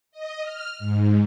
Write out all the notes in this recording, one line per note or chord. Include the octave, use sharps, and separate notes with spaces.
D#5
F6
G#2